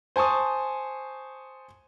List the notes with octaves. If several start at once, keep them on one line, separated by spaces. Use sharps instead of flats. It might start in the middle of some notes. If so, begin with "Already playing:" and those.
C5 G#5 A5 C#6 D#6